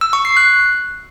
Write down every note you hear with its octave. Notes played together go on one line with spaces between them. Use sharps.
E6
C#6
C7
F#6